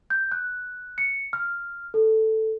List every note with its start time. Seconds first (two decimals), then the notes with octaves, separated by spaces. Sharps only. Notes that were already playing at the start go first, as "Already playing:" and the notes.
0.10 G6
0.32 F#6
0.98 C#7
1.33 F6
1.94 A4